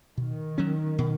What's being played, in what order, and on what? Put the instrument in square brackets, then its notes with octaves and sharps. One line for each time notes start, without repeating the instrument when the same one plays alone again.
[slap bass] B2 [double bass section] D#3
[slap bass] F#3 C#4
B2